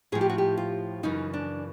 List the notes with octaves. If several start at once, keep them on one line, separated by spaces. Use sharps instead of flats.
A2 F3 G#4
G4
F#4
G4
F4
F#2 C#3 E3 D#4
D4